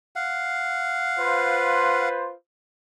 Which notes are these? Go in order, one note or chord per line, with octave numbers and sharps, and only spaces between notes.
F5 F#5
F4 B4 C5